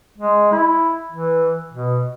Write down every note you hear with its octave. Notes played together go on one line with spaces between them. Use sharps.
G#3
E4
E3
B2